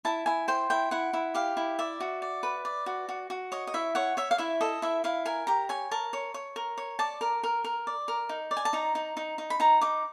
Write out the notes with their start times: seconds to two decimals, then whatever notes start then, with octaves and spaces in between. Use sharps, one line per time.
0.05 E4 A5
0.26 E4 G#5
0.48 C5 G5
0.70 E4 G5
0.91 E4 F#5
1.13 E4
1.34 G4 F5
1.57 E4
1.79 D5 E5
2.00 F#4
2.22 D5
2.43 B4
2.65 D5
2.86 F#4
3.09 F#4
3.30 F#4
3.52 C#5 D#5
3.67 D#5
3.74 E4 E5
3.95 C#5 F#5
4.17 C#5 E5
4.31 F5
4.38 E4 E5
4.61 A4 D#5
4.82 E4 E5
5.04 E4 F5
5.25 A#4 G#5
5.47 G4 A#5
5.69 C#5 G#5
5.91 A#4 A5
6.13 C#5
6.34 C#5
6.56 A#4
6.77 C#5
6.99 D5 A5
7.21 A#4
7.43 A#4
7.64 A#4
7.87 D5
8.08 A#4
8.29 D#4
8.51 D5
8.57 G#5
8.65 A5
8.73 D#4 A#5
8.95 D#4
9.17 D#4
9.38 D#4
9.50 B5
9.60 D#4 A#5
9.81 D#4 D6